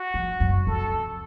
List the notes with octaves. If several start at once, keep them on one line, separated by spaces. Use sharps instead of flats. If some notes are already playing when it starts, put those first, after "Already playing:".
Already playing: F#4
F3
F#2
F2 A4